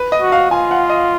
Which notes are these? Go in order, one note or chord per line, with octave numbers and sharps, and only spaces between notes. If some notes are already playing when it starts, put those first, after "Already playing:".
Already playing: B4
D#5
F#4
F5
F4 G#5
F#5
D#5